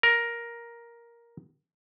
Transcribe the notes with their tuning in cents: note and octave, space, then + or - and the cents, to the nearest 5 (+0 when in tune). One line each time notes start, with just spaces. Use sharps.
A#4 +10